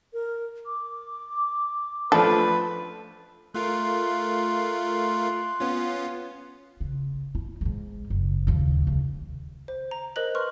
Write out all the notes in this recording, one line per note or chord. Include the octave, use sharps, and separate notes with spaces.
A#4
D6
F3 A3 D4 A4 B4
A3 F4 A#4 C6 F#6
B3 C#4 F4
C#3
E4
G#2 G#3
F#1
D#2 C#3
C#2
C5
A#5
A#4 C5 D#5 F#6 F#7
B4 C6 C#6 F6 F#6